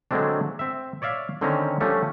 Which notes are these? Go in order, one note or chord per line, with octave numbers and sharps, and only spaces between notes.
D3 F#3 G#3 A3 C4 D4
C4 E5
C#5 D5 E5 F5
D3 D#3 C4 C#4 A#5
F3 G3 A3 C#4 D4